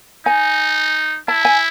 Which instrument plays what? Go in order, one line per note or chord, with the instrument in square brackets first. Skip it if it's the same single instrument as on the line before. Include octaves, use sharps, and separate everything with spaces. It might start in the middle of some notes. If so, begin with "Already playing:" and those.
[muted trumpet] D#4 [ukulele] G#5
[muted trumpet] E4 [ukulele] A5
[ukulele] G#5